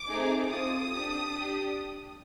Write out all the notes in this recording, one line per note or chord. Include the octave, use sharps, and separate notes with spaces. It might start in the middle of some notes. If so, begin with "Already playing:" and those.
Already playing: D6
A3 C4 D#4 G#4
C4 F4 A4 D#6
D4 G4
D4 G4